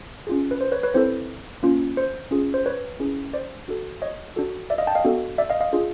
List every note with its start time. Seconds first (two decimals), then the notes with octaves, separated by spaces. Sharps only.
0.27 C#4 F4 G#4
0.51 B4
0.61 C5
0.72 B4 C#5
0.83 B4 C#5
0.94 C4 E4 A4 C5
1.63 A#3 C#4 F4
1.97 C5
2.31 C#4 F4 G#4
2.54 C5
2.66 B4 C#5
3.00 C#4 E4 G#4
3.33 C5 D5
3.68 D4 F#4 A4
4.02 C#5 D#5
4.36 D4 F#4 A4
4.70 D5 E5
4.78 D#5 F5
4.87 G5 A5
4.95 D#5 F5
5.05 B3 D4 F#4 A4
5.38 D5 E5
5.50 D#5 F5
5.61 D#5 F5
5.73 D4 F4 G#4